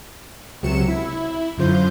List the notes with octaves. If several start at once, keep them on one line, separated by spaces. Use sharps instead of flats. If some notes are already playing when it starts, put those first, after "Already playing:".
C#2 C3 F#3 C#7 E7
E4
F#2 D3 F4 C5 G6